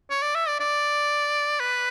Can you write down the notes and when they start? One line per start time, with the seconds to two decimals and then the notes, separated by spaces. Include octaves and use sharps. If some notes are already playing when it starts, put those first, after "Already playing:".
0.10 C#5
0.22 D5
0.35 E5
0.48 D5
0.60 D5
1.60 B4